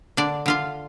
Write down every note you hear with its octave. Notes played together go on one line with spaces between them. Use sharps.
D3 D4 D5
D3 F4 F5